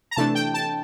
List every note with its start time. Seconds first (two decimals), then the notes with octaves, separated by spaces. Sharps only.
0.11 A#5
0.16 C3 E3 A3 D4 A5
0.35 G5
0.54 A5